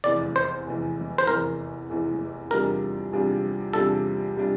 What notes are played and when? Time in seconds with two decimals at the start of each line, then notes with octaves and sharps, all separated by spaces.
0.04 F1 E2 E3 D5
0.36 C5
0.67 F1 E2 E3
1.18 C5
1.27 F1 E2 E3 A#4
1.90 F1 E2 E3
2.50 E2 C3 G3 D4 F4 A#4
3.12 E2 C3 G3 D4 F4
3.73 E2 C3 G3 D4 F4 A4
4.37 C3 G3 D4 F4